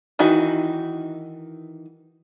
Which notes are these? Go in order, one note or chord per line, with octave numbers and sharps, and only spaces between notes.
D#3 E3 D#4 F#4